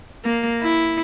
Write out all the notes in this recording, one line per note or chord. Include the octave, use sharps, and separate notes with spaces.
A#3
E4